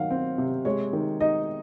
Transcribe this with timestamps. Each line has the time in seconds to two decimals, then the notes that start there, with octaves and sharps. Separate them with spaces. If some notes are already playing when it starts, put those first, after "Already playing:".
Already playing: D#3 F#3 F5 F#5
0.10 C4
0.38 C3
0.65 G#3 C#5
0.93 D#3
1.20 D#4 D#5